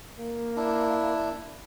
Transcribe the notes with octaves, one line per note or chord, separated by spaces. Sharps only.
A#3
D4 E4